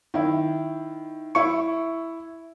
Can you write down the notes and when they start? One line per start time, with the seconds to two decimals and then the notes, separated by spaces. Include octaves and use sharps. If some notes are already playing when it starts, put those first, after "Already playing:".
0.14 D#3 E4
1.35 E4 C#6